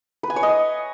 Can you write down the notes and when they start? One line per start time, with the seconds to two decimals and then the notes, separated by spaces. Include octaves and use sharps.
0.23 B4
0.30 G#5
0.36 C#5
0.43 D#5